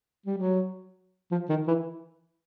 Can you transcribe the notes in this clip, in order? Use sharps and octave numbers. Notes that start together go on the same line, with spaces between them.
G3
F#3
F3
D#3
E3